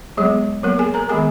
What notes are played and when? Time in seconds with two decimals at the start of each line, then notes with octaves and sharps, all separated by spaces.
0.17 F#3 G#3 B3 G#4
0.63 F#3 A#3 B3 A#4
0.79 G#4 G#5
0.94 A#4 A#5
1.09 D#3 G#3 B3 G#4 G#5